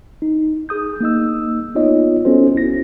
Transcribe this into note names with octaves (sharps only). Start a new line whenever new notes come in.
D#4
G#4 D#6 G6
A#3 D#4 D#5 E6
B3 D#4 F4 C#5 D#5
B3 C#4 F#4 A4 C5
G1 E4 A#6